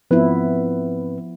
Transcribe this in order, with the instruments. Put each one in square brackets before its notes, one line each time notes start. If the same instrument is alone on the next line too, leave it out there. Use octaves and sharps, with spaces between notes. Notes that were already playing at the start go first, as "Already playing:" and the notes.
[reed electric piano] G#2 C4 B4 [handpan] F3 B3 E4